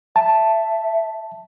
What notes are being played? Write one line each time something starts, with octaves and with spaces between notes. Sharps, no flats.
E5 A5